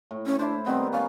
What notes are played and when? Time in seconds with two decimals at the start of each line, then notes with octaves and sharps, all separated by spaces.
0.11 A2
0.26 C#4
0.39 D4 E4 C5
0.66 D#3 G3 B3 C4
0.93 A#3 C#4 F5